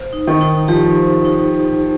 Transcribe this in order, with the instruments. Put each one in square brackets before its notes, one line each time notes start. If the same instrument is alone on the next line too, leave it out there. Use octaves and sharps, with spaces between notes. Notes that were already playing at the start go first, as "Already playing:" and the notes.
Already playing: [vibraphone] C5
D#4
[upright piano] D#3
[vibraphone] D#4
[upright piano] F3 [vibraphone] G4
[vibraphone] C5
D#4